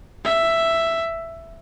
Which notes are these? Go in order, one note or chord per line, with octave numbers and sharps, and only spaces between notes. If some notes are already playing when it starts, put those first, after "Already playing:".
E5